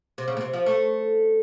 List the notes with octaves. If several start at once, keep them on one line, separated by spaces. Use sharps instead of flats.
C3
C#3
A#2
C3
F3
A3